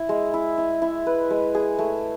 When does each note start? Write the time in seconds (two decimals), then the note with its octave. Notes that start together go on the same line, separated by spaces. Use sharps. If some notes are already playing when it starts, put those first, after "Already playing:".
Already playing: E4
0.09 G#3
0.34 E4
0.58 E4
0.82 E4
1.07 B4
1.30 G#3
1.55 G#4
1.79 A3